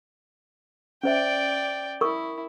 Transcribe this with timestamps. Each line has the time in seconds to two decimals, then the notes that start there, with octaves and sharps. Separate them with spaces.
1.03 C#4 C5 D5 E5 G5
2.01 E4 A#4 C#6 D#6